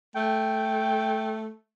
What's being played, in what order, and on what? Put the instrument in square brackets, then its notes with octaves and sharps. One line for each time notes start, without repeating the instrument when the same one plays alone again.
[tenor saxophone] A3 [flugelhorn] G5